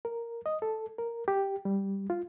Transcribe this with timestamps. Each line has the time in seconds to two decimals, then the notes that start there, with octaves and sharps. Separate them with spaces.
0.05 A#4
0.46 D#5
0.62 A4
0.98 A#4
1.28 G4
1.65 G3
2.10 F4